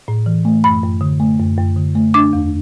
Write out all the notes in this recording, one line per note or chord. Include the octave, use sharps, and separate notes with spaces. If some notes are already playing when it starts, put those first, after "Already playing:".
A2
E3
A3
F#2 B5
F#2
D3
A3
F#2
F#2
D3
A3
D4 D6
E2